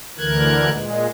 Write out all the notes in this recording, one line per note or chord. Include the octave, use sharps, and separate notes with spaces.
D2 D3 E3 A#4 F#6 G#6
A#2 G#3